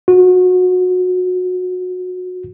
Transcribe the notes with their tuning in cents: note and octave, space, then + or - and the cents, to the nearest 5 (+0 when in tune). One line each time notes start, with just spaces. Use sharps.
F#4 -20